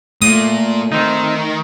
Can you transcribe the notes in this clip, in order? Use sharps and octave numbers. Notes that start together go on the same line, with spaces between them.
A#2 A3 D#6
D#3 C4 D#4